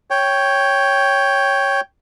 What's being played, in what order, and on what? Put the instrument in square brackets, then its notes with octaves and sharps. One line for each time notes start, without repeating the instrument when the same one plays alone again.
[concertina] C#5 G5